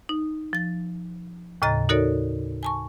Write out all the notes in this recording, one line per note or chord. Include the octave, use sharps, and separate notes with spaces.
D#4
F3 A6
D#2 A2 C#3 D#5 A#5 A6
D#4 F#4 A4 A#4 C#5 D5
G#5 A5 C#6